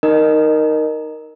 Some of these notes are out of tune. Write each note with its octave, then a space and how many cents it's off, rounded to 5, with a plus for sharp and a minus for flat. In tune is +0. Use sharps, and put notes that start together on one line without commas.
D#4 +0 A#4 +0 D#5 -20